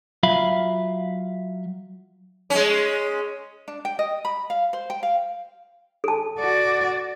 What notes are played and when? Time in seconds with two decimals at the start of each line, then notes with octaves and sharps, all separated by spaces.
0.23 F#3 F4 E5 F5 B5
2.50 G#3 C#4
3.68 D4
3.85 G5
3.99 D#5
4.25 B5
4.50 F5
4.73 C5
4.90 G5
5.03 F5
6.04 A4 A5
6.39 F#4 D5